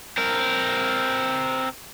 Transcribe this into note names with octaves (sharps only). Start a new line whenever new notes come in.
C4 A#4